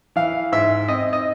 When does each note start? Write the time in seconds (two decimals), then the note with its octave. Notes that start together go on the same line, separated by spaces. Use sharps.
0.16 E3 F5
0.52 G#2 E5
0.88 C4 D#5
1.13 D#5